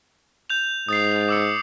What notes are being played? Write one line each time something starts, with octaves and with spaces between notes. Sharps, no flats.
G6 F7
G#2 D#6 A6 C7
D6 E6 C#7